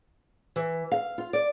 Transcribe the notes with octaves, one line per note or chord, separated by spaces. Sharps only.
E3
F5
F4
D5